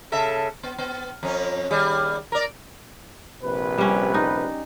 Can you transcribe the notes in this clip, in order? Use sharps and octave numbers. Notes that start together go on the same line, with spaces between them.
C#3 A4 E5
B3
B3
F2 C#4
D#2 G3 G#4
A#4 D5
A#1 C3 B4
G3 C#4
D#4